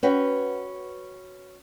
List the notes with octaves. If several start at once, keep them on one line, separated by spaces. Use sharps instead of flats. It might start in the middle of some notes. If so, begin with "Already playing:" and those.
C#4 F#4 B4 G5